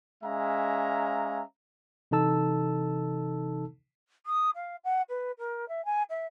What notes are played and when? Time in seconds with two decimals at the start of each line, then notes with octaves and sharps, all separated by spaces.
0.24 G#3 C#4 E5 F5 A#5
2.11 C3 E3 D#4 A4 A5 E6
4.26 D#6
4.56 F5
4.84 F#5
5.09 B4
5.39 A#4
5.69 E5
5.85 G#5
6.10 E5